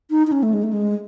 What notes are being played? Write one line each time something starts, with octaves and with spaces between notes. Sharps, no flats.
D#4
D#4
C#4
A3
G#3
A3
G#3